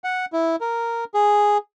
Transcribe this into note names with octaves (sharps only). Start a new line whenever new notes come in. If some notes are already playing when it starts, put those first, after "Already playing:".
F#5
E4
A#4
G#4